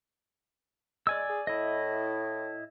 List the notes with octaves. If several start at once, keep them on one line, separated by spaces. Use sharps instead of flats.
G#3 D5 G#5 E6
G#4
A2 E4 D#5